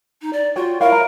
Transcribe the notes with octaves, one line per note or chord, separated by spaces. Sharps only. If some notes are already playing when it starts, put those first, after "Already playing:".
D#4
D5
F4 F#4 C#5 G5
E4 A#4 C#5 F5
A#5